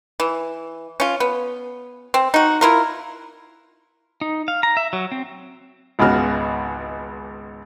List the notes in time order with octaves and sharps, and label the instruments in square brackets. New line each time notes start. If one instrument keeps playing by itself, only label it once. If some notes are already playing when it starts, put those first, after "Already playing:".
[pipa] E3
C#4 F4
B3
C4
D#4 F#4
E4 F4 A#4
[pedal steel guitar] D#4
F5
A#5
E5
F#3
C4
[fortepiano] G#1 C#2 C#3 B3 F#4 F6